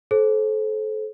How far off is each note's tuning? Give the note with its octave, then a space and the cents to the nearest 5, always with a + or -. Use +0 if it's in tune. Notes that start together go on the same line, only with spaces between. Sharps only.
A4 -30 C5 +20